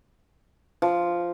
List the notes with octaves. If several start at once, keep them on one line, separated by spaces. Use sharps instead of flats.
F3